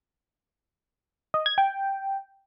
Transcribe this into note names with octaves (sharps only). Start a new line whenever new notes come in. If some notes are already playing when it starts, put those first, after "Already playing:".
D#5
G#6
G5